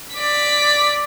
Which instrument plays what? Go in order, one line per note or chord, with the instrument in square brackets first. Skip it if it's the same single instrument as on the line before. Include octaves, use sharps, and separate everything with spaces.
[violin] D5 B6